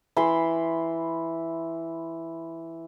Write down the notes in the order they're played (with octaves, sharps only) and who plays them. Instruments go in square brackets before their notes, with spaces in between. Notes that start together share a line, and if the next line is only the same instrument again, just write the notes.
[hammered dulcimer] E3 B5 C6